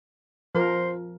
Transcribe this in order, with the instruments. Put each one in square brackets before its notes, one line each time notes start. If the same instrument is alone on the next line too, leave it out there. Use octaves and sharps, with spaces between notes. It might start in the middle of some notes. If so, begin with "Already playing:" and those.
[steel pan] F3 A#4 [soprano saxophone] C5